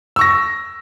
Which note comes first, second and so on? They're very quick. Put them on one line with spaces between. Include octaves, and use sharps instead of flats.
E6 C#6 A#6